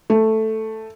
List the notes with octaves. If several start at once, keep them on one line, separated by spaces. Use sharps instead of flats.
A3